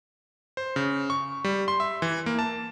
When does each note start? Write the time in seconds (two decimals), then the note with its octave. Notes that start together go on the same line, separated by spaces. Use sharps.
0.57 C5
0.76 C#3
1.10 C#6
1.44 G3
1.68 C6
1.80 E5
2.02 E3
2.26 A#3
2.39 A5